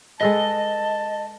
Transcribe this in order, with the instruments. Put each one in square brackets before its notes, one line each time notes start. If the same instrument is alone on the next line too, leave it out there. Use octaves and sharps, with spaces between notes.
[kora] G#3 A4 B4 [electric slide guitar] D#5 [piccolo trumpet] A5